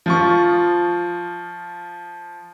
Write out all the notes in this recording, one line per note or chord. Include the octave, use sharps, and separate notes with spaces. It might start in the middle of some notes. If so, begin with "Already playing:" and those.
F3 F4 C#6